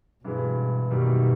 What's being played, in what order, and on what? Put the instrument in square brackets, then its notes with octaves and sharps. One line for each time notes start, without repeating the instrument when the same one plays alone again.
[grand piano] G2 E3 G#3 [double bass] B2
[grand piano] F#2 D#3 G3 A#3 [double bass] B2